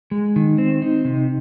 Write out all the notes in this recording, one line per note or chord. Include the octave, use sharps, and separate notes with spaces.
G#3
D#3
C4
D#4
C3